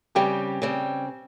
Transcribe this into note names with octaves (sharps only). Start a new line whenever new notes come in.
C#3 G3 C4 G4 G5
C#3 G3 C4